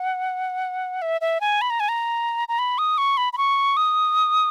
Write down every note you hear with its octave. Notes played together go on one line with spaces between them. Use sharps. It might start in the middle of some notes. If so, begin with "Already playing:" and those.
Already playing: F#5
E5
E5
G#5
B5
A#5
G#5
A#5
A#5
B5
D#6
C#6
B5
B5
C#6
D#6